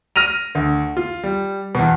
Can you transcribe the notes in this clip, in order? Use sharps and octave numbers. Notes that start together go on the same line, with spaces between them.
F6 A#6 D#7 F7
D2
F4
G3
E2 B2